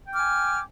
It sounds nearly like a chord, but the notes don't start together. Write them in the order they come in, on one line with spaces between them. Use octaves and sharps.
G5 D6 F6 G#5